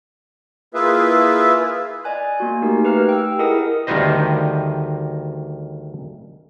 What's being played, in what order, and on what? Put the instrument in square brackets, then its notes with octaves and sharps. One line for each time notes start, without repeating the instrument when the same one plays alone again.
[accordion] A#3 E4 F4 G#4 B4 E5
[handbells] D5 D#5 G#5 F#6
A#3 F#4 G#5
A3 D#4 G4 A#4
G4 B4 F5 A#5 F6
G5 E6
E4 G#4 A#4 D#5 F#5 D#6
[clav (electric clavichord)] D2 D#3 G3 B4 C5 D#5